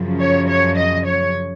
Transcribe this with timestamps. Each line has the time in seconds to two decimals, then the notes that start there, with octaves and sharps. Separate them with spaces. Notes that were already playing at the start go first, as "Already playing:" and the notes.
Already playing: F#2 C#3 F3
0.20 C#5
0.48 C#5
0.78 D#5
1.07 C#5